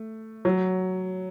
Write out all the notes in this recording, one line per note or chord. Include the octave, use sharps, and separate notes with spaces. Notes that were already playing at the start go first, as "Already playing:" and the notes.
Already playing: A3
F#3